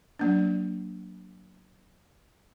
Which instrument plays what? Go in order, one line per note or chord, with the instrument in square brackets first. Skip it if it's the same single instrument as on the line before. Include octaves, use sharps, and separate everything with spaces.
[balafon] F#3 A#3 D4